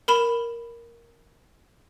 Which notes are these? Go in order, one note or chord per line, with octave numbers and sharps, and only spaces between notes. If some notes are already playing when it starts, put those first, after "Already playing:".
A#4 B5 E7